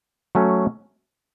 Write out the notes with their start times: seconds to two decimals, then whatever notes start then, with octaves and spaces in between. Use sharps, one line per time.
0.35 F#3 A3 C#4